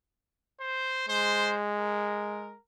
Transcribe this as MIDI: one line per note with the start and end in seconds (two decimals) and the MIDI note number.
0.60 1.05 72
1.09 2.56 56
1.09 1.55 72
1.79 2.58 70